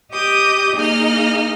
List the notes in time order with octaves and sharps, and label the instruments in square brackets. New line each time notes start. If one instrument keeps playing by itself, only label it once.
[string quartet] G4 D#5 D6 D#6 G6
A#3 D#4 G#4 D#5 F6